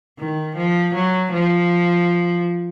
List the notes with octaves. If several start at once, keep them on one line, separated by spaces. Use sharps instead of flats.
D#3
F3
F#3
F3